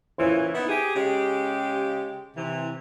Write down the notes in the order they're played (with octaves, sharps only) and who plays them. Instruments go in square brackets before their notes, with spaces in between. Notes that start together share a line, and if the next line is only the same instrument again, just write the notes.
[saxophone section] A#2 C#3 E3 [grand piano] C5
[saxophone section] B3 D#4 E4
G4 G#4
C#3 G#3 G4
C3 E3